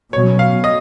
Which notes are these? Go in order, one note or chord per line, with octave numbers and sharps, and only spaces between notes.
B2 F#3 C#4 C#5
F5
D#5